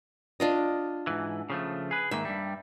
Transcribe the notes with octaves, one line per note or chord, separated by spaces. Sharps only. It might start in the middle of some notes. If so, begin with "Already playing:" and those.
D4 F4 D#5
G#2 E3
C#3 F3 A3
G#4 B4
G#2 D#3 A#3 E5
G2 G3